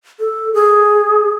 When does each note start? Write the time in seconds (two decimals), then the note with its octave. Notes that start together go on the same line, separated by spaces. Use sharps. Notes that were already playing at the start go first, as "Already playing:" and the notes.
0.20 A4
0.54 G#4